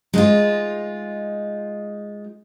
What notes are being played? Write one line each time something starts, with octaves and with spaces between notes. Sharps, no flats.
G#3 D#4 F4